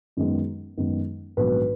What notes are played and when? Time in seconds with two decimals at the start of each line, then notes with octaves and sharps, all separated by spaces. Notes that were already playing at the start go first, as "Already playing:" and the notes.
0.17 F#2 D#3 G#3 B3
0.77 F#2 D#3 G#3 B3
1.37 A#1 G#2 D#3 F#3 B3 B4